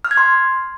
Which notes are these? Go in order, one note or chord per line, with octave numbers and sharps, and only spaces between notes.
F6
G#6
C6